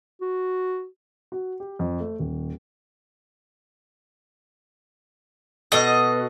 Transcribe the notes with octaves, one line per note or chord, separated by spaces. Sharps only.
F#4
F#4
G4
F2
A3
D#1
B2 A4 D#5